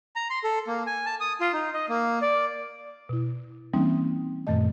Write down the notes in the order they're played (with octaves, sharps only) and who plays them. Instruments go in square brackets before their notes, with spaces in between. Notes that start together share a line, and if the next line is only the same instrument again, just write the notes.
[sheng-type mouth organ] A#5
C6
A4
A#3
G#5
A5
D#6
F4
D#4
D#5
A#3
D5
[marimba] B2 E4
E3 G3 A#3 C4 C#4 D#4
F#2 A#2 D#3 A3 D#5